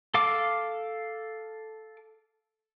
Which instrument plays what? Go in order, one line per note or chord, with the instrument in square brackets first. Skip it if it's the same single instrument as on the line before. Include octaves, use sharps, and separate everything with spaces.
[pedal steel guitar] A4 F5 D6